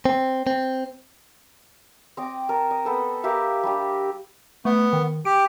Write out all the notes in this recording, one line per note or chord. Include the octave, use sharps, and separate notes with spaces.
C4
C4
C4 D#5 D6
A#4 A5
D#5
B3 A4 C5
G4 A#4 E5 F5
G3 D4 G4
A3 B3
D#3
G4 D7